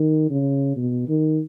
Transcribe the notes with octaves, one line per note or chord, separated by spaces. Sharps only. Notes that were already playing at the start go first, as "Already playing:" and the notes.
Already playing: D#3
C#3
B2
D#3